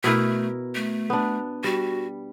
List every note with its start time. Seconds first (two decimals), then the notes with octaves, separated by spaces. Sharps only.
0.04 B2 A3 E4 A#4
0.75 A3
1.10 B3 D4
1.64 G3 F#4